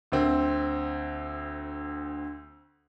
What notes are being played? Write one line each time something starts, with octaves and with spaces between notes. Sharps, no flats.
D2 C4